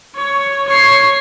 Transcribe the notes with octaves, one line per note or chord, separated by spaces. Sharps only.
C#5
C#5 C7